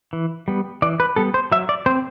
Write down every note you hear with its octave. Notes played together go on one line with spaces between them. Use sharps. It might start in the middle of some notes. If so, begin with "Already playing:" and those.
E3
G3 B3
E3 D5
B4
G3 B3 A4
C5
F#3 E5
D5
C4 C5